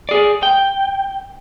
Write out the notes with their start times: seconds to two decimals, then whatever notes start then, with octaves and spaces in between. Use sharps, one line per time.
0.09 G#4 D5
0.43 G5